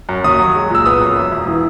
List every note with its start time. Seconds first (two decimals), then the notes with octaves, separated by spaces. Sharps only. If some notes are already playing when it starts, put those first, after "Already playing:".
0.09 F#2
0.24 D#2 D#6
0.39 F#3
0.55 G#3
0.70 A#2 E6
0.86 B3 D#6
1.01 F#2
1.16 E1
1.32 E1
1.48 E3